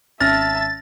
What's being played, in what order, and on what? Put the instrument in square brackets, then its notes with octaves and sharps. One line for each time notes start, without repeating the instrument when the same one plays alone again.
[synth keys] G#1 C#4 [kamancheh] E5 A5 [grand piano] F6 A#6 [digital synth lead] A6